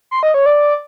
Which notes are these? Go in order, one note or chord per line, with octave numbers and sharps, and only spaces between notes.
C6
D#5
C#5
D5